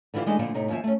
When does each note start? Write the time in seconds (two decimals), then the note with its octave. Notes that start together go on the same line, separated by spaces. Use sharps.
0.14 D3 E3 E4 F4 G4
0.26 E3 G#3 A3 D4 D#4 D#5
0.39 A#2 D3 F3 A3 E4 A4
0.54 A2 C3 D#4
0.69 D#2 F3 C#5 E5 G#5
0.84 A3 C#4